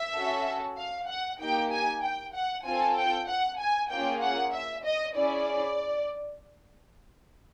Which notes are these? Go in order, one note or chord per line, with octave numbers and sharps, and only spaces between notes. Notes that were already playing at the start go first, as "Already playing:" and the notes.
Already playing: E5
C#4 F#4 A4
F5
F#5
A#3 D#4 G4 G5
G#5
G5
F#5
C4 F4 A4 G#5
G5
F#5
G#5
A#3 C#4 F4 G#4 G5
F#5
E5
D#5
C#4 E4 G#4 D5